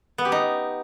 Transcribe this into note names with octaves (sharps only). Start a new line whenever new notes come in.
B3
G4
D#4